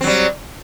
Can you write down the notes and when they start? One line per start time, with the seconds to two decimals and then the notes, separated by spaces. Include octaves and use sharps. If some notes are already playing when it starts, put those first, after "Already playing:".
0.01 C4
0.04 F#3
0.07 G3